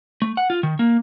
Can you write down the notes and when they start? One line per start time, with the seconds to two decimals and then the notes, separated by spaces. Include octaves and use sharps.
0.22 A3
0.37 F#5
0.50 F4
0.63 D#3
0.79 A#3